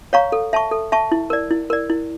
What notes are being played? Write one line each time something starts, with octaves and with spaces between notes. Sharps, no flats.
C#5 F5 A#5 C#6
A4
E5 A5 C#6
A4
E5 A5 C#6
E4
A#4 D5
E4
A#4 D5
E4